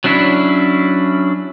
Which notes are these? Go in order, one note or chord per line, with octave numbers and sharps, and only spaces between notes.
F#3 C#4 D4 E4